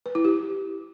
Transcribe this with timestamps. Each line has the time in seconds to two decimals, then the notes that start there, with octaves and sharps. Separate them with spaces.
0.06 B4
0.15 E4
0.25 G4